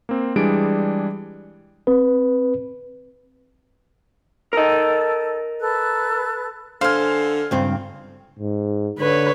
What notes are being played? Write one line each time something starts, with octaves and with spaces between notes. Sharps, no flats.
A#3 C4
E3 G3 G#3 D4 G#4 D7
C4 B4
A4 A#4 D#5
A4 B4 F#6
D3 C5 F5 G#5 F6
C#2 G2 C4
G#2
D3 B4 C#5